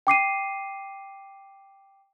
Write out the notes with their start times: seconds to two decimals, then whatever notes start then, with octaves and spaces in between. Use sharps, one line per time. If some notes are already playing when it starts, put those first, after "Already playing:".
0.07 G5 D6 C7 D#7